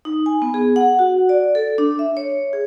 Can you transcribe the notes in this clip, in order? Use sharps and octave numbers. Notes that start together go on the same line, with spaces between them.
D#4
G#5
B3
G#4
F#5
F#4
D5
A4
D4
E5
C#5
G#4